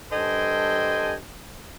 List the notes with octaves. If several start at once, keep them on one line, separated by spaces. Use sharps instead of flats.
G2 A4 C5 D#5 G5 G#5